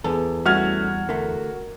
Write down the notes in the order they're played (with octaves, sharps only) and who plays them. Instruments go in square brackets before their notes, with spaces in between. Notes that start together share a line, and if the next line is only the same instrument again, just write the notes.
[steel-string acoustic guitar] E2 [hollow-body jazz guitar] A4
[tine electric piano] G3 [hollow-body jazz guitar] A3 C#4 E4 [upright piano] F#4 F6 G#6
[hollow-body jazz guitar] D3 A3 [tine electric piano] A#4